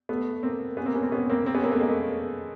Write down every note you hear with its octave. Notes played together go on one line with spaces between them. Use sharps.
A3 B3
A#3 C4
B3 C#4
A#3 C4
B3 C#4
A#3 C4
B3 C#4
A#3 C4
A#3 C4
B3 C#4
A#3 C4
A3 B3
G#3 A#3